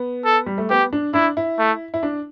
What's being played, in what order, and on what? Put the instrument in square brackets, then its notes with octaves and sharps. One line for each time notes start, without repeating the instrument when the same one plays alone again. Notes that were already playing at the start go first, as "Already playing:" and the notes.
Already playing: [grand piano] B3
[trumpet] A4
[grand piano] G3
A3
[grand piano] B3 [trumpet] G4
[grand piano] D4
[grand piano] D4 [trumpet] E4
[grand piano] E4
[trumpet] A3
[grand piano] E4
D4